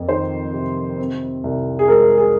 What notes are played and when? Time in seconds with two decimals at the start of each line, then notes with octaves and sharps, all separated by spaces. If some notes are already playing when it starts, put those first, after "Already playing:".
Already playing: F2 A#3
0.09 D#3 C5
0.54 C3
0.98 C4
1.44 C2
1.79 G#4
1.88 G#3 A#4
2.18 G#4